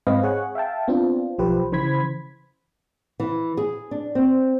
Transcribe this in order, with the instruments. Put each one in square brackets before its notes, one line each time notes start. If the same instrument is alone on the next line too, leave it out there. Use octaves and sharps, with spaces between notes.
[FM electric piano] G#2 C4 B4 D#5 F5
G#4 C#5 F#5
E5 F5 G5 A5
B3 C4 D4 F4
B1 F3 G4 B4 C5
C#3 E3 C5 B5 G#6 B6
[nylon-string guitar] E3
G#4
D4
C4